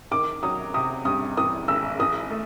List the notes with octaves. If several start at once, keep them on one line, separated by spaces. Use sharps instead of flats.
D#3 D6
F#3 D#6
C3 D#6
G2 D#6
E3 D#6
G#1 E6
E3 D#6
A3